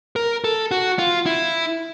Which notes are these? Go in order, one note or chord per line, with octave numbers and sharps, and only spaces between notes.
A#4
A4
F#4
F4
E4